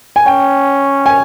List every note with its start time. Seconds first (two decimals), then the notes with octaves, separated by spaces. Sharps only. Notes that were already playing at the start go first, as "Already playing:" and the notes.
0.16 G#5
0.26 C#4 G5
1.06 G#5